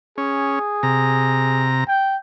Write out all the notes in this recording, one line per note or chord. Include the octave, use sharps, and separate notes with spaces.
C#4 G#4
C3 A#5
G5